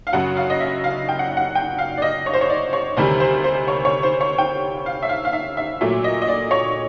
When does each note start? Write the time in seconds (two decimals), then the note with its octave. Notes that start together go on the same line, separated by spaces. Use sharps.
0.07 F5
0.13 F#2 C#3 F#3 F#5
0.37 F5
0.50 D#5
0.60 E5
0.84 F5
1.09 G5
1.19 F#5
1.37 F#5
1.55 G5
1.78 F5
1.97 D5
2.02 D#5
2.26 C#5
2.33 C5
2.41 C#5
2.50 D5
2.73 C#5
2.97 D2 C3 D#3 G3 C5
3.20 C5
3.44 C5
3.68 C#5
3.85 C#5
4.03 C5
4.21 C#5
4.38 G5
4.86 F5
5.03 E5
5.09 F5
5.25 F5
5.33 E5
5.57 E5
5.81 A#2 F#3 A3 E5
6.04 D#5
6.22 D#5
6.28 D5
6.51 C#5